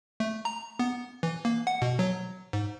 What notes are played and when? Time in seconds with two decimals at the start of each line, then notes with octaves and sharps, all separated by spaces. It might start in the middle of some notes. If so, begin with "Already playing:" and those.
0.20 A3
0.45 A#5
0.79 B3
1.23 E3
1.45 A#3
1.67 F#5
1.82 B2
1.99 F#3
2.53 G#2